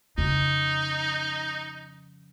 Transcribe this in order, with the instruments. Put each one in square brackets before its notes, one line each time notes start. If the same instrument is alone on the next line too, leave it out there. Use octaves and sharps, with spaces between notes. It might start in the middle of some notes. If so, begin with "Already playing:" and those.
[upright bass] F2 C#3 [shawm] D#4